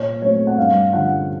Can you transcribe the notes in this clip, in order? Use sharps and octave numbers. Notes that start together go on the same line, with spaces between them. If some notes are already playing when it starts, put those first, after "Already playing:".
Already playing: A#2 C#5
F#3 A3 C4 C#5
F#5
G2 F5
D3 F3 F#5